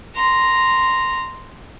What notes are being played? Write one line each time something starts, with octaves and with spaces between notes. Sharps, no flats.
A#5 C6